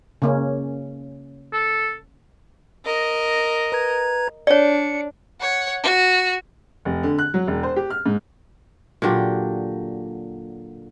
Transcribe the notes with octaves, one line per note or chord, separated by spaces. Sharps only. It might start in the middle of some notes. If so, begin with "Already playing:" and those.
C#3 A#3 C#4
A4
A#4 D#5
B4 A#5 G#6
D4 C#5 D5 C#7
C#5 F#5
F#4
F1
D3
F#6
F#3
E1
C5
G4
F6
G#2
A#2 D3 F#3 G4